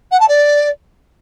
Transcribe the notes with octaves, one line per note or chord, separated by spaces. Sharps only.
F#5
A5
D5